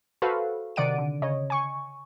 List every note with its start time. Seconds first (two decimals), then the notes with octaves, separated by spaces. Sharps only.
0.22 F#4 A4 B4 C5 F5
0.76 C3 D#3 D5 F#5 D7 D#7
0.98 D3
1.22 C#3 C#5 D#5
1.50 G#5 C#6